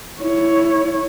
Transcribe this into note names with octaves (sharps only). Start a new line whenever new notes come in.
E4 C#5